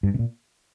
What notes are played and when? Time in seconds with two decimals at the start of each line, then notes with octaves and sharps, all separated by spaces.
0.03 G2
0.14 C3
0.19 A#2